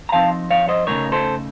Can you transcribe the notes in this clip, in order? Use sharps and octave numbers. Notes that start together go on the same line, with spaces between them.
A#5
F3 C4 D#4 F5 A5
C#5 F5
C5 D#5
C#3 F3 A3 D#4 A#4 C#5
A4 C5